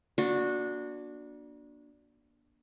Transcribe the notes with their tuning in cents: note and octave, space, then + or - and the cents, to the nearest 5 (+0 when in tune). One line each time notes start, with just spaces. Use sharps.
A#3 +40 D4 +0 F#4 -20